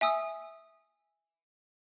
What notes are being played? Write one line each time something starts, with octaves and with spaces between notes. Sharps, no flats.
E5 G#5 D#6 E6